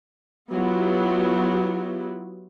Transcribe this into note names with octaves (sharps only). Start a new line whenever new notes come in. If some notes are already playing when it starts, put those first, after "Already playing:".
F#3 B3 E4 F4 G4